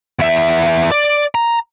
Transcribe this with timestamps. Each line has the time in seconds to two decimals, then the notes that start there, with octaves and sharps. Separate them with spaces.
0.19 E2 E5
0.91 D5
1.35 A#5